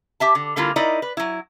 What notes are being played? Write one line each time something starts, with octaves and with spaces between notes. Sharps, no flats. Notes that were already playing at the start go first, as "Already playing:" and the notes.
G4 E5 A5
D3
D3 G3 A#3 E4 F4
D#4 E4 A#4 D5 D#5
B4
F#3 E4